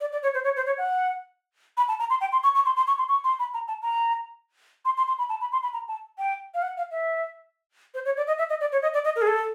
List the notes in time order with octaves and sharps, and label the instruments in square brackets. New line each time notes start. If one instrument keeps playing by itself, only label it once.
[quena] D5
D5
C#5
C5
C#5
C5
C#5
F#5
B5
A5
A#5
C6
G5
C6
C#6
C#6
C6
C6
C#6
C6
C#6
C6
B5
A#5
A5
A#5
C6
C6
C6
B5
A5
B5
C6
B5
A#5
A5
G5
F5
F#5
F5
E5
C5
C#5
D5
D#5
E5
D#5
D5
C#5
D#5
D5
D#5
A#4
G#4
A4